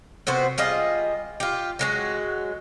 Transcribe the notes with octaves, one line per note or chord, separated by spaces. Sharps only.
C3 B3 F#4 C5
G3 F4 G#4 D#5
F4 G4
F#3 G#3 F#4